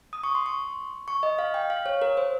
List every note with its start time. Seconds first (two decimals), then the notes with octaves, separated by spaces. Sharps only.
0.13 D#6
0.24 C#6
0.35 C6
0.46 C#6
1.08 C#6
1.23 D#5
1.39 F5
1.54 G5
1.70 F5
1.86 C#5
2.02 A#4
2.17 C5